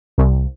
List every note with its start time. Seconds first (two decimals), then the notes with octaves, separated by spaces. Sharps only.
0.18 C2